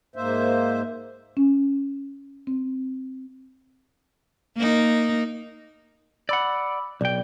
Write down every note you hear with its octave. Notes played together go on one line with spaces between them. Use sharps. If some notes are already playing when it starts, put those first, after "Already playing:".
G#2 A#3 C5 E5
C#4
C4
A#3 D#4
D5 F#5 B5 D6 E6
B1 D5 G5